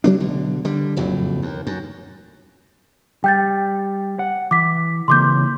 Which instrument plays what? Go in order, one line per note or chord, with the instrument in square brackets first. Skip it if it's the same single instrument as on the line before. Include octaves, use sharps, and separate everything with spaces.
[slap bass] C#3 F#3 A3 D4
B1 D3
D3 G3
F#1 F2 A2 F#3
D#2
F#2
[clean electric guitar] G3 [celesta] G5 G6 A6
[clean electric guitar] F#5
[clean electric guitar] E3 [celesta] D6 B6
[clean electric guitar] C#3 E3 A#3 [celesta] C6 D6 G6